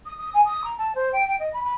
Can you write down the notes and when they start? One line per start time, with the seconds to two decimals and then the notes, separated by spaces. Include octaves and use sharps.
0.06 D#6
0.18 D#6
0.34 G#5
0.45 D#6
0.64 A#5
0.78 A5
0.95 C5
1.13 G5
1.28 G5
1.39 D#5
1.53 B5
1.64 B5